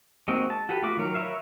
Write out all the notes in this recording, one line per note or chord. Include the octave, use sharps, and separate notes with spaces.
G#3 A#3 C4 D#4 F#4
A5
F#4 G4 A4 B4
A3 B3 F4 F#4 D6
D#3 F#3 A#4
A#4 B4 C#5 E5 F5